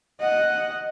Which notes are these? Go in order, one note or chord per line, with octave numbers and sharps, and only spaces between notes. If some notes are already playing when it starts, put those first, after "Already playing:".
D#5 F#5